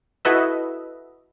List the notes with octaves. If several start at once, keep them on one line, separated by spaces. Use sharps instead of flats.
E4 F#4 A4 B4 D#5 E5